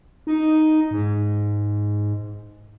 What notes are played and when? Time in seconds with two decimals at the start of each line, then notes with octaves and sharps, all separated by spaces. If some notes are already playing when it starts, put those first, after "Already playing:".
0.27 D#4
0.91 G#2